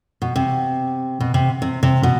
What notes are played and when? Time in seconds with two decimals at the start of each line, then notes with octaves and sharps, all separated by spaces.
0.22 B2
0.36 C3
1.20 B2
1.34 C3
1.62 C3
1.83 C3
2.03 B2